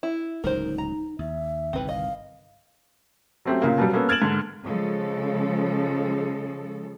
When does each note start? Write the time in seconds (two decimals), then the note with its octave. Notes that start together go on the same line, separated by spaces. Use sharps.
0.03 E4
0.44 D1 C#2 F#3 D#4 A#4 C5
0.78 A#5
1.19 D#2 E5
1.73 G1 C2 D#3 C4 B4
1.89 D#5 F5
3.45 F#3 A3 C4 C#4 G4
3.62 A#2 C#3 A#3
3.78 B2 F#3 G3
3.93 A#3 B3 C#4 A4
4.09 F6 G#6 A6 D7 E7 F#7
4.22 G#2 D3
4.64 C#3 F3 G#3 A4